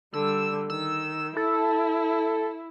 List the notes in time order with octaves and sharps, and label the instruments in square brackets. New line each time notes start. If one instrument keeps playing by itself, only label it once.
[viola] D3 G3 [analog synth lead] E6
[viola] D#3 [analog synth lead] E6
[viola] E4 [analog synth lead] A4